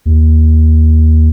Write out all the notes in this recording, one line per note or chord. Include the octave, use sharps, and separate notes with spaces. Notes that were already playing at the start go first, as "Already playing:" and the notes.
D#2